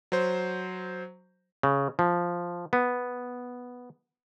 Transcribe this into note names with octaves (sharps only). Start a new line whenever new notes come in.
F#3 C5
C#3
F3
B3